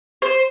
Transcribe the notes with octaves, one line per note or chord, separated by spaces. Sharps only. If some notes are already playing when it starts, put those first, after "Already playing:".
C5